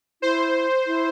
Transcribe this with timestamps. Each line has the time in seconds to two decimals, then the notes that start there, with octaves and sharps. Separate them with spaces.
0.22 E4 C5
0.86 E4